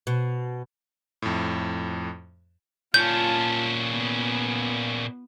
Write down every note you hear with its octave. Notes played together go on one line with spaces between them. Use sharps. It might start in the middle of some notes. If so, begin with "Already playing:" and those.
B2
F2 A2
A#2 C#4 F4 A5 G6
B3